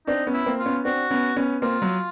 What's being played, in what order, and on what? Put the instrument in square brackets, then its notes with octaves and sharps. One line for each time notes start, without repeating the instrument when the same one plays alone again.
[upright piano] C4 D4 [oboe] D#4
[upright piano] B3 C#4
[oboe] E4
[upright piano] A#3 C4
[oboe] F4
[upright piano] B3 C#4
[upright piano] C4 D4 [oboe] F#4
[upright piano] B3 C#4
B3 C#4
[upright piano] A#3 C4 [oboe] F4
[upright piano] F#3